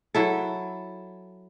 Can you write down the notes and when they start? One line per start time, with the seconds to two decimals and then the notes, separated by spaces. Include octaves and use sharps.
0.14 F#3 E4 A4